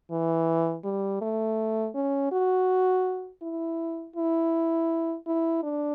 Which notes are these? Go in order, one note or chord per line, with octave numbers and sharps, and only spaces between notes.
E3
G3
A3
C#4
F#4
E4
E4
E4
D4